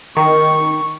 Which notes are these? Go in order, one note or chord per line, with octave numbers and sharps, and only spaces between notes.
D#3 C#6